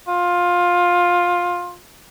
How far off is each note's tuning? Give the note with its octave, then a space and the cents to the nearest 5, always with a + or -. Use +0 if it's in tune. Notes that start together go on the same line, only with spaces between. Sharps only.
F4 +15